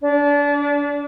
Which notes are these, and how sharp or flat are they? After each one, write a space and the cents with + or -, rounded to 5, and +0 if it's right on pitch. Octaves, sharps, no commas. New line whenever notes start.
D4 -30